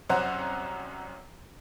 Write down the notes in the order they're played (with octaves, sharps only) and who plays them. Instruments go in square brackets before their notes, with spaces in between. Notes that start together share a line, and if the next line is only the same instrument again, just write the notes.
[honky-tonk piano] C2 F#2 C#4 C5 F#5 A#5